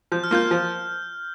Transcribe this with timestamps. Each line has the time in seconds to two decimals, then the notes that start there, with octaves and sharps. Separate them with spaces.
0.12 F3 G6
0.24 F6
0.31 A#3 F4 G6
0.51 F3